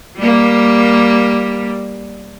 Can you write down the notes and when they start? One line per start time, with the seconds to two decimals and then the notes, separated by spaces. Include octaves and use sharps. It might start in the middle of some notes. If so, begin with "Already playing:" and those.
0.19 G3 A#3